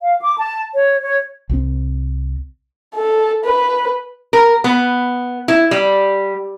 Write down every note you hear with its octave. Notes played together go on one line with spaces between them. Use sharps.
F5
D6
A5
C#5
C#5
C2 E3 C4
A4
B4
A#4
B3
E4
G3